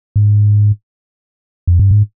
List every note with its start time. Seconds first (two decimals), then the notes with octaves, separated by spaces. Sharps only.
0.16 G#2
1.67 F2
1.79 G2
1.91 G#2